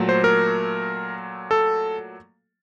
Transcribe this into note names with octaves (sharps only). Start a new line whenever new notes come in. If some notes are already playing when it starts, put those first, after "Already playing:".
Already playing: A#2 F#3 A3
C5
A#4
A4